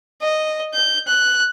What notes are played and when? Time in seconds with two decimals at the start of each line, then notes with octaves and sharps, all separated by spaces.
0.22 D#5
0.74 G6
1.07 F#6